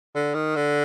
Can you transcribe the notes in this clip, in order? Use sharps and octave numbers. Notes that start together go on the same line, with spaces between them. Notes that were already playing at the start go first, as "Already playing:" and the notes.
D3
D#3
D3